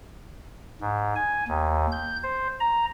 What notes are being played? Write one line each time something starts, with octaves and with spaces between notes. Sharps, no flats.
G#2
G#5
D#2
G6
C5
A#5